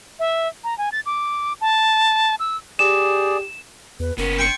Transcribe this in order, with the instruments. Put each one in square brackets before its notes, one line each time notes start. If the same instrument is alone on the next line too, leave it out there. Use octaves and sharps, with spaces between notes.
[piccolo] E5
A#5
G#5
A6
D6
A5
E6
[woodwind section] G4 [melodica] G#4 D5 [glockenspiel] E7
[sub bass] E2 [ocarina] B4
[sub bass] F#1 [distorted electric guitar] B3 C#4 [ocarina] A#4
[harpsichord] G5 C6 C#6